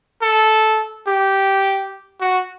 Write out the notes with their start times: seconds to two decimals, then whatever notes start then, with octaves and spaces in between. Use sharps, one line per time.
0.22 A4
1.07 G4
2.21 F#4